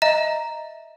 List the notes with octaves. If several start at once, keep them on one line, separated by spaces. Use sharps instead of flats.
D#5 E5 A#5